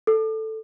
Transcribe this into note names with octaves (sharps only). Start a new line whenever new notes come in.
A4